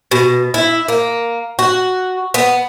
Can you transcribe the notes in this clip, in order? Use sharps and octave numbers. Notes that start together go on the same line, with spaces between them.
B2
E4
A#3
F#4
B3